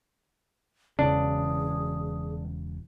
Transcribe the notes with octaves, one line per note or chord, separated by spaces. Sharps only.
E1 E2 C#3 D4 G#4